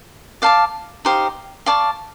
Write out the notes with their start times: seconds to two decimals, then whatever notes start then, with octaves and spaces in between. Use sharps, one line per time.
0.42 D5 F5 A5 D6
1.05 D#4 G4 C5 F5
1.66 D5 F5 A5 C#6